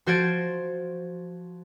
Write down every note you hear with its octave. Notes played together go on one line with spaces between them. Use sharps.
F3 F#4 C5 G#6 A6 D7